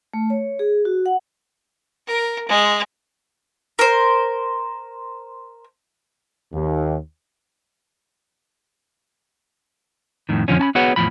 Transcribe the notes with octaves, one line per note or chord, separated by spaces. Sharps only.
A3
C#5
G#4
F#4
F#5
A#4
G#3
A#4 C5
D#2
F2 A2 D#3
F2 D3 F3 C#4
C#4 A5 B5
B3 F#4 G#4 B4 C#5 F#5
E2 A2 F3 B5